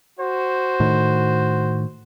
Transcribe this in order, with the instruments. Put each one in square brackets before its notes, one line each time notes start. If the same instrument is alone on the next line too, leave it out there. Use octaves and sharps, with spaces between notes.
[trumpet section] F#4 C5
[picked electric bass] A2 D#3